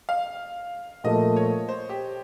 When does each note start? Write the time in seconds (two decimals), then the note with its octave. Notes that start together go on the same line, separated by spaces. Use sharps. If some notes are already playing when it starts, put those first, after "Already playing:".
0.09 F5
1.04 A#2 F3 A3 D#5
1.36 C#5
1.69 C5
1.90 G4